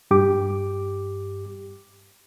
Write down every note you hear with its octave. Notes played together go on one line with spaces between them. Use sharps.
G2 G4 D6